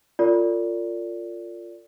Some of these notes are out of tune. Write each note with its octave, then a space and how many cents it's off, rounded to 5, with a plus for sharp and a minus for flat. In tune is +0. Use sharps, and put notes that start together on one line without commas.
F4 +0 A#4 -45 D5 -25